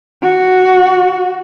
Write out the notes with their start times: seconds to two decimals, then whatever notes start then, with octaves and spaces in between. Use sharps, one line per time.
0.23 F#4